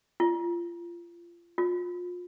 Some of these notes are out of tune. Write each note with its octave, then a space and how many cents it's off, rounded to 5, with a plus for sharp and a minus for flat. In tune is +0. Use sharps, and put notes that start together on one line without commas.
F4 -25
F4 +30